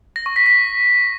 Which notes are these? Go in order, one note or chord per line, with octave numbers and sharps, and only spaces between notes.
A#6
C#6
B6
B6